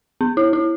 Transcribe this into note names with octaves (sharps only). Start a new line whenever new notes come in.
B3
E4
E4